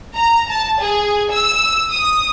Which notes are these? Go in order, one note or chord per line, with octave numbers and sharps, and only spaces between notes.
A#5
A5
G#4
E6
D#6